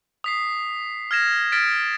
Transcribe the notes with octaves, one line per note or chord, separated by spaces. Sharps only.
D#6 B6 C7
F6 G#6 A#6 E7
F6 A6 B6 D7